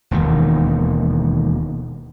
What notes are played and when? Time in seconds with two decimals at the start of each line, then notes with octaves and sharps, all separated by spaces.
0.11 E1 D#2 D#3